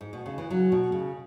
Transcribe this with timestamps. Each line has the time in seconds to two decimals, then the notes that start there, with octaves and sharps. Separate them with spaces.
0.01 G#2
0.13 B2
0.26 C#3
0.38 E3
0.50 C#3 F#3
0.72 B2
0.92 C#3